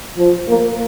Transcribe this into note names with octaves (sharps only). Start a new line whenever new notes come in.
F3
A#3